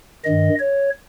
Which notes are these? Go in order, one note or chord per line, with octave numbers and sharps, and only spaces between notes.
G2 D#3 D#5
C#5